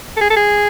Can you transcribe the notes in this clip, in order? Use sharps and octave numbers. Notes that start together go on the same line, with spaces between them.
A4
G#4
A4
G#4